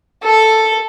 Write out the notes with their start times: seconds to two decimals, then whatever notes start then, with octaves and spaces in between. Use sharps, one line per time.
0.24 A4